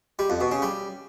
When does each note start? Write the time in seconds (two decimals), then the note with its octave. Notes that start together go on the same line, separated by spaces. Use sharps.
0.19 G3
0.30 F2
0.41 B2
0.51 C#3
0.62 G3